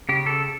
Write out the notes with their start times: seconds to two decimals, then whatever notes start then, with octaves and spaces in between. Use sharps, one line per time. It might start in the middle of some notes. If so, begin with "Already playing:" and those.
0.09 C#3 G4
0.26 A4